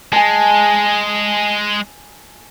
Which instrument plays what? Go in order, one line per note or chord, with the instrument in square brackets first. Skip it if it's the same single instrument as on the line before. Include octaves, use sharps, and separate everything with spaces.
[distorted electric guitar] G#3 [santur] G#5 A5